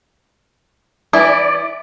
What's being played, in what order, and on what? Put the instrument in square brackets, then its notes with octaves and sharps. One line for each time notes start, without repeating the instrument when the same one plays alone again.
[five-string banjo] E3 E4 [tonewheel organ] D5